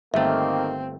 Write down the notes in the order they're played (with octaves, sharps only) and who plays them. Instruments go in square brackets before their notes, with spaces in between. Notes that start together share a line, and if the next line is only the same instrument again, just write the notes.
[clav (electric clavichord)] G1 A3 [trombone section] D#3 A#3 [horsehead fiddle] C4 [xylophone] E5